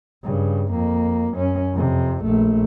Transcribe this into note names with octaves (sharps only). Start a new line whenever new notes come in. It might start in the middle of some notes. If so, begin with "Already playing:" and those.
G2 C#3
F2 A#3
F#2 C#4
F2 C3
A#1 A3